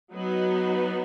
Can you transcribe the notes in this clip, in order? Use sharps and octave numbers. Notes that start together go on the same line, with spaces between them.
F#3 B3 D#4 F#4 B4